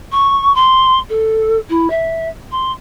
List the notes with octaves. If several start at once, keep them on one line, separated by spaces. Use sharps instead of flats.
C#6
C6
A4
E4
E5
C6